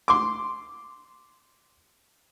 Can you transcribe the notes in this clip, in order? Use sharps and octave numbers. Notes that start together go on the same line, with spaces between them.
C6 D6